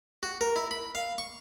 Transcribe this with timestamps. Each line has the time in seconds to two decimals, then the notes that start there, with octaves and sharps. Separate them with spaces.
0.23 F#4
0.41 A#4
0.56 E4
0.71 B5
0.95 F5
1.18 C#6